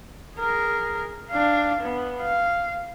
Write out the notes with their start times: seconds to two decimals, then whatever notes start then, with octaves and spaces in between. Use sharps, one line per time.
0.37 G#4 A#4
1.30 D4 F5
1.80 B3
2.21 F5